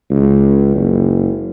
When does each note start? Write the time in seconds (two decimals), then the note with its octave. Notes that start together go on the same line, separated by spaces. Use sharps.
0.11 C#2
0.76 F#1